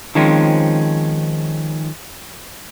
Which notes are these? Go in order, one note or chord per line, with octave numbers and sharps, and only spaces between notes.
D#3 F3 G#3 C4 C#4